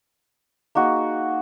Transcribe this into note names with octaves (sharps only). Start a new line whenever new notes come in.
A#3 D#4 F#4 G#4